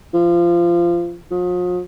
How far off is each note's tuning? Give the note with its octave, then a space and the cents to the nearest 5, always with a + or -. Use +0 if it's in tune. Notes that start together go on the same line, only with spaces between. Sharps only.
F3 -20
F3 +45